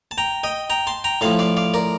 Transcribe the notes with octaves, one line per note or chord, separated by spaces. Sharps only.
A5
G5 A#5
D#5 G5
G5 A#5
A5 C6
G5 A#5
A2 F3 F5 A5
D5 F5
D5 F5
A#4 D5